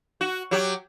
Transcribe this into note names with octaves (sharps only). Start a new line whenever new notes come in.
F#4
F#3 G4